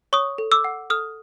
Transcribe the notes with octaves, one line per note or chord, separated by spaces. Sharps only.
C#5 C#6 D#6
A4
D6 E6
F#5
A4 D#6 F6